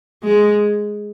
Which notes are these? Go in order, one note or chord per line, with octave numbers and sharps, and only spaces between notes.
G#3